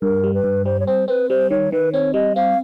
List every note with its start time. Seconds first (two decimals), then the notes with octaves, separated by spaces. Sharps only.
0.02 G2 A#4
0.24 G3
0.34 B4
0.44 G2
0.65 G3 C5
0.80 C#5
0.87 C4 C5
1.08 C4 B4
1.29 G3 C5
1.50 D#3 C#5
1.72 D#3 B4
1.92 C4 C#5
2.14 G3 D#5
2.36 C4 F5